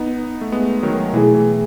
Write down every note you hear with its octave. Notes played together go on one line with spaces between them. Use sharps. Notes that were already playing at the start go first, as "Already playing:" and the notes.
Already playing: B3 D#4
A3
G#3 B3
D#3 F#3
D#3
B2 E3 A3 E4 G#4
E3